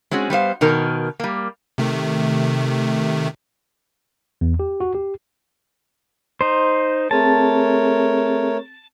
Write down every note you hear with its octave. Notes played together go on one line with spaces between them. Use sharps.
G#3 C4 C#4 F#4 G#4
G3 B3 C5 F5
B2 D#3 A#4 A#5
G3 A#3
C3 D#3 A3
E2
G4
F#4
G4
D#4 C5
A3 C4 G#4 A#4 C#5 A5